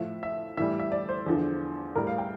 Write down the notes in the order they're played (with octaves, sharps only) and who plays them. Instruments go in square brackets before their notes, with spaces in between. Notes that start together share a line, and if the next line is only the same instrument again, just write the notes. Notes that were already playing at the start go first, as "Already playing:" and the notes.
Already playing: [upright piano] A2 F3 E5
E5
A2 E3 G3 E5
E5
D5
C5
E2 D3 F3
A2 G3 A#4
F5
G5